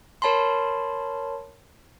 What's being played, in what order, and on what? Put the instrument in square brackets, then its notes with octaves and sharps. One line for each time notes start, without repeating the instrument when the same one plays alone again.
[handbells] A#4 C#5 A5 B5 C6